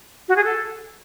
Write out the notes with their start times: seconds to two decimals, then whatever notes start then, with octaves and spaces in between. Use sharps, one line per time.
0.28 F#4
0.36 G#4
0.44 A4